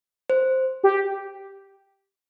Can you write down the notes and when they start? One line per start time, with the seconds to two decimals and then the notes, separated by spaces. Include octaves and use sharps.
0.30 C5
0.84 G4